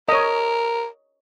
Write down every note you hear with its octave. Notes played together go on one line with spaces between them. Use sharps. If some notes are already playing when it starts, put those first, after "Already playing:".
A#4 C#5 D#5